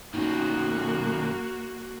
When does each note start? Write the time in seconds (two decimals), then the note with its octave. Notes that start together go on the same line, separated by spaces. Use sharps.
0.14 F#2 D#3 A#3 F#4